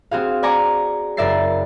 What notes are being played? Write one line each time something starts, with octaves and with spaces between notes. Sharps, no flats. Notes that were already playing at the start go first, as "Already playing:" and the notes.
C4 F#4 G#4 F5
D5 G#5 A#5 C#6 D6
F#1 A#4 D5 E5 A6 C7